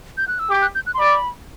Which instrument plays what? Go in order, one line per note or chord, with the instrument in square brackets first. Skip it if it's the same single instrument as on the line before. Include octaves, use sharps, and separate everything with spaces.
[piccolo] G6
F#6
E6
[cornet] G4 [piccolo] D6
[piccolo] F#6
G6
F#6
C6
[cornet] D5 [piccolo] B5